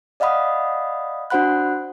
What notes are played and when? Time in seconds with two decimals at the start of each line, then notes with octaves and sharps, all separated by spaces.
0.20 D5 D#5 F5 F#5 B5 D#6
1.30 D4 F#4 C5 F#5 B5 F#6